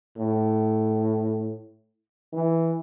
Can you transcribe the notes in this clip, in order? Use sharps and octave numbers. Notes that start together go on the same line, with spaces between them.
A2
E3